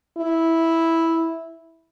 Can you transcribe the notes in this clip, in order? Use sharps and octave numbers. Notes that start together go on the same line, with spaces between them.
E4